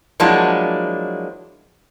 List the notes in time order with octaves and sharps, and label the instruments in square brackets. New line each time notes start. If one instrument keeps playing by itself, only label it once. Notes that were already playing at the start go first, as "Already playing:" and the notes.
[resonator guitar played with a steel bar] F3 F#3 G#3 A#3 D4 E4